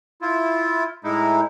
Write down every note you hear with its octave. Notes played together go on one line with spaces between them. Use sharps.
E4 F4
A2 G#3 D#4 E4